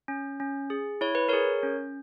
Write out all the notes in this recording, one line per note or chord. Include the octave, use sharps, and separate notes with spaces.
C#4
C#4
G#4
E4 C#5
B4
G#4 A#4 C#5
C#4